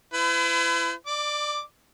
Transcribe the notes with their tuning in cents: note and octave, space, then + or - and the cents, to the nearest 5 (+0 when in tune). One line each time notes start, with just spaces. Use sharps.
E4 +30 B4 +45
D5 +20 D6 +0